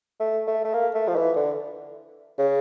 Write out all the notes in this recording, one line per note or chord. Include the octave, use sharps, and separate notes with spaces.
A3
A3
A3
A#3
A3
F3
E3
D3
C#3